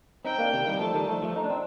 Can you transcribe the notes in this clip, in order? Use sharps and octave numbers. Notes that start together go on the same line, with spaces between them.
C4 D#4 G5
A#3 D4
C3 D#3
D#3 G3
F3 A3 A5
D#3 G3
F3 A3
F3 A3
D#4
D4
C4